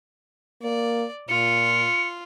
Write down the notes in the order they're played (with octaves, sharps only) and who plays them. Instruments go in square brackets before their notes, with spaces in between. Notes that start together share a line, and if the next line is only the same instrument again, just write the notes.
[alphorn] A#3 [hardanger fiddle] D5
[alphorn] A#2 [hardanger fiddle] F4 [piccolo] C#7